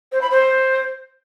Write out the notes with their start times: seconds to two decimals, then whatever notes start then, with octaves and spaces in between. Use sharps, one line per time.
0.12 C5
0.21 B5
0.31 C5